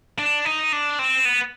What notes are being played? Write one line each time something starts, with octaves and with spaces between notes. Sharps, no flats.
D4
D#4
D4
C4
B3